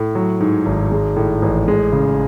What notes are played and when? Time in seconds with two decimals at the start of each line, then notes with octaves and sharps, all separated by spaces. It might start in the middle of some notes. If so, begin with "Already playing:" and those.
Already playing: A2
0.15 F#3
0.40 G#2
0.66 G#1
0.92 G#3
1.16 A2
1.42 A1
1.68 G#3
1.93 C#3